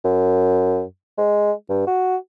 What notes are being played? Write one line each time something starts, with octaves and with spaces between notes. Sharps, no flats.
F#2
G#3
G2
F#4